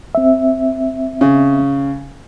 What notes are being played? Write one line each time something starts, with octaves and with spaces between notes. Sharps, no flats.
C4 E5
C#3